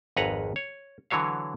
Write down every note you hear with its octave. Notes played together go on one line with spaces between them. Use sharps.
G#1 F2 B4 F#5 G#5 A#5
C#5
D3 E3 F#3 C#5 F5